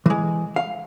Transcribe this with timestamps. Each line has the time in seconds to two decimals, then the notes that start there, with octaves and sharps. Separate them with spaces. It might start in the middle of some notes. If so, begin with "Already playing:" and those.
0.06 E3 G#3
0.56 F5